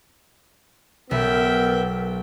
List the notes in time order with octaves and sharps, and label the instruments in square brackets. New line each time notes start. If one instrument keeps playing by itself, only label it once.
[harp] B1 [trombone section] B3 [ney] A#4 [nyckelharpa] E5 G5